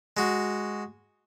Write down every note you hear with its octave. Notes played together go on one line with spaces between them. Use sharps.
G#3 F#4